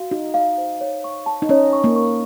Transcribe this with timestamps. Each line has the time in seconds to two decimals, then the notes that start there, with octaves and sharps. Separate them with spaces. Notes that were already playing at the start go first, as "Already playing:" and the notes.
Already playing: F#4 F5
0.11 D#4 F#4
0.34 F5
0.58 C5
0.81 C#5
1.04 C#6
1.26 A5
1.42 D#4
1.49 C#4 C#5
1.73 C#6
1.84 A#3
1.96 C#6